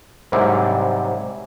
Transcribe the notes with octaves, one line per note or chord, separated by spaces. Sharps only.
G#2 C3 F#3 G3 E4